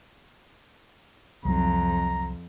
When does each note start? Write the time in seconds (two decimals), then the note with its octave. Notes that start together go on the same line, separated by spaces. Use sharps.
1.45 C2 F2 F#3 A#5